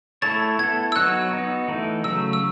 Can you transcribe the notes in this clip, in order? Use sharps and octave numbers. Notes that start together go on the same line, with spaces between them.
A3 E4 A4 C#5 A6
B3 E4 A4 G#6
E6
F#3 B3 D#4 F#4 C#5 F#6
B3 D#4 F#4
E3 A3 D#4
C#3 F#3 A3 E6
E6